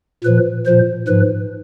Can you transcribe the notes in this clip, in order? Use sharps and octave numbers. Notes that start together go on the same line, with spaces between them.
A#2 F3 B4
A#2 F3 C5
G#2 F3 B4